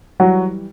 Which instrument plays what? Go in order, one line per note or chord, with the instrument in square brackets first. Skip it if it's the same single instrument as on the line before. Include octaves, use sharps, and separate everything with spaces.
[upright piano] E3 F#3 G3 F#4